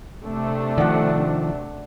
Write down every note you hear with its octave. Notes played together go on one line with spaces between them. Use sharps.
C3 A3 D4
D#3 F3 D5 F#5